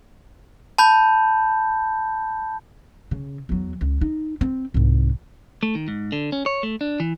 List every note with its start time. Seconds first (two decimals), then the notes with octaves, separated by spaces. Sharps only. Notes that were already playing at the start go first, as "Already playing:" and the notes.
0.78 A5 B5 G6
3.11 C#3
3.49 E2 F#3
3.81 C#2
4.01 D#4
4.41 C4
4.74 C2 G#2
5.63 A3
5.75 D#3
5.88 G#2
6.12 D3
6.32 C#4
6.46 C#5
6.63 A3
6.81 D4
7.00 E3